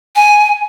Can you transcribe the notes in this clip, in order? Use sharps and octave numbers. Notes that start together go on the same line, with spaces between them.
G#5